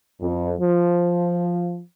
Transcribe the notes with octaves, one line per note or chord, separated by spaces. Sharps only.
F2
F3